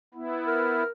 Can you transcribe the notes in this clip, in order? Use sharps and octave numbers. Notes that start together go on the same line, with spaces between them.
B3 E4
A#4